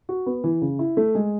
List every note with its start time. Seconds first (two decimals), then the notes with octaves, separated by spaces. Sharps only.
0.09 F#4
0.26 B3
0.44 E3
0.62 C#3
0.79 E4
0.97 A3
1.15 G#3